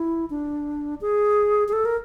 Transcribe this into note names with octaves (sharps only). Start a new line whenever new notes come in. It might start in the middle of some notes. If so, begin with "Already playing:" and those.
Already playing: E4
D4
G#4
G#4
A4
A#4